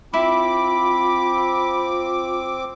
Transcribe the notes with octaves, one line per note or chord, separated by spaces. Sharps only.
C4 E4 F4 B5 D6